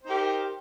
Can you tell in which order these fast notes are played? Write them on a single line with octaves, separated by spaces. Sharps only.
C5 D#4 G4 A#4